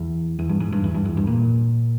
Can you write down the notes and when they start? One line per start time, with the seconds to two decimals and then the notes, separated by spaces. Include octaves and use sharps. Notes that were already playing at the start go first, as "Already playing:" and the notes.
Already playing: E2
0.39 E2
0.49 G2
0.60 G#2
0.72 G2
0.84 E2
0.94 G2
1.05 E2
1.17 G2
1.27 A#2